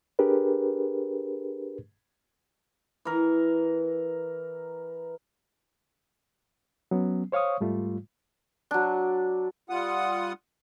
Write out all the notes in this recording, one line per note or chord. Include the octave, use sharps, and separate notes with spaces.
D4 G4 G#4 A#4 B4
E3 A#4
F#3 B3 C#4
C5 C#5 F5 C#6 D#6
G#2 G3 A3 F4
F#3 D4
G3 F4 F#5 D#6